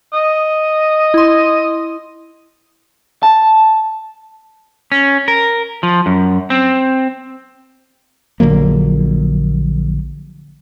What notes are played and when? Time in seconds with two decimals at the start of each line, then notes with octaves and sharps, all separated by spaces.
0.13 D#5
1.14 E4 C6
3.23 A5
4.92 C#4
5.28 A#4
5.83 F3
6.06 F#2
6.50 C4
8.40 A#1 D3 F#3 A#3